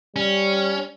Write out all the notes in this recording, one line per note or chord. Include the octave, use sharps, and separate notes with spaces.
G3 C#4